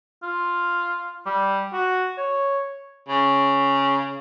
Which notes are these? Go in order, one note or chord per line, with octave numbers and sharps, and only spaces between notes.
F4
G3
F#4
C#5
C#3